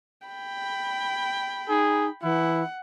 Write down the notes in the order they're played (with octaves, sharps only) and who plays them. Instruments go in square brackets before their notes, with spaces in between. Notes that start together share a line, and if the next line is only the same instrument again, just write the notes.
[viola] G5 B5
[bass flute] D#4 [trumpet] G#4
[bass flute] E3 [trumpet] E4 [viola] F#5